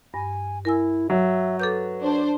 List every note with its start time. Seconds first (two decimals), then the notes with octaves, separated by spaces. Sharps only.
0.14 G2 G#5
0.65 E4 A#4 G#5 E6
1.10 F#3 E5
1.60 A4 B4 D6 G6
2.00 D4 C5